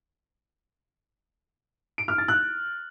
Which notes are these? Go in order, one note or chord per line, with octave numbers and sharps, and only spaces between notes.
D7
F6
A6
F#6